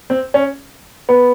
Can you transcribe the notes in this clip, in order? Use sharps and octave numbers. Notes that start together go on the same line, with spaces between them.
C4
C#4
B3